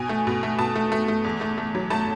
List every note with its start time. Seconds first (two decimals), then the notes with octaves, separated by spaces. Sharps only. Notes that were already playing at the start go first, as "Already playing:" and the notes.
Already playing: B2 G#5
0.09 A3
0.27 B2
0.43 A3
0.59 B2 A5
0.76 A3
0.92 A3
1.08 A3
1.24 E2
1.41 A3
1.58 A3
1.75 F#3
1.90 A3 A5